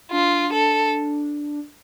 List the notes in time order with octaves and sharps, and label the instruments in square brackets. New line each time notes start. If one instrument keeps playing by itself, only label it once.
[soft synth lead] D4 [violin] F4
[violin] A4